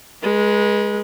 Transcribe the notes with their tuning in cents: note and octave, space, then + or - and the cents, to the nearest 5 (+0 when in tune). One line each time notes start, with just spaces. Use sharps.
G#3 +0 B4 -40